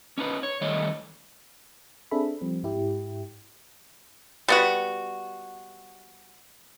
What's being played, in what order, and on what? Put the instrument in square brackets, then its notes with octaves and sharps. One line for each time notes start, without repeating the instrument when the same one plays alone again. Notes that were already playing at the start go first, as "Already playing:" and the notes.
[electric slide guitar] C#4 D#4 B4
C#5
D#3 G3 A3 C#5 D#5
[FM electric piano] C4 D4 G#4 A4 E5 B5
F3 G3 C4
G#2 E4 G4
[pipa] G3 B3 F#4